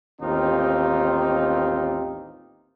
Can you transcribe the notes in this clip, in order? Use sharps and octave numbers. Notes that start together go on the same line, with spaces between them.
A1 D#2 C4 D#4 F4 G4